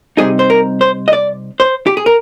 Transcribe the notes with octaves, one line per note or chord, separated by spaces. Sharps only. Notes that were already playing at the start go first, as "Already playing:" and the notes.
C3 G3 C4 D#4 G#4
C5
A#4
C5
D#5
D5
C5
G4
G#4
A#4